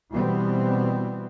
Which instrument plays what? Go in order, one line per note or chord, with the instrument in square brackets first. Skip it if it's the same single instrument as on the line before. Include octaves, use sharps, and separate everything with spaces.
[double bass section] B2 E3 G3 B3 C4